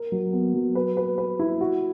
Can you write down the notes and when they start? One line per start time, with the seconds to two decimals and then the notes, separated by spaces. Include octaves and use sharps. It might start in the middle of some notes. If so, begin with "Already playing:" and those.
Already playing: A#4
0.12 F#3
0.33 B3
0.54 F#3
0.75 B4
0.97 B4
1.18 B4
1.39 E4
1.61 F#4